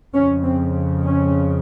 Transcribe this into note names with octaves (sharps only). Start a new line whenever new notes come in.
F2 C#3 C#4
C4
C#4